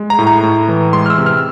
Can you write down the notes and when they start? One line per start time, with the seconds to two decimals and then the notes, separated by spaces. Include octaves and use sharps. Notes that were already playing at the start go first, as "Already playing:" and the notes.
Already playing: G#3
0.10 A#5
0.19 A2
0.27 A#5
0.43 A2
0.68 E3
0.93 G#3 C6
1.06 F6
1.10 E6
1.18 C3
1.26 F6